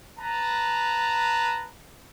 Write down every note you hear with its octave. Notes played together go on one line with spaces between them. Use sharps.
B4 A5 A#5